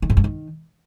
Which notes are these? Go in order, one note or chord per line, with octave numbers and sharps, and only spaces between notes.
D#3
G#2
G2
D#3